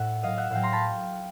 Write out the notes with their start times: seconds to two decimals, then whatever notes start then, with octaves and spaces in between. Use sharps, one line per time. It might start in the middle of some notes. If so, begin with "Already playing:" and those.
Already playing: A2 E5 F#5
0.23 A2 F#3 D#5 F5
0.37 E5 F#5
0.51 A2 F#3 F5 G5
0.63 A#5 C6
0.72 A5 B5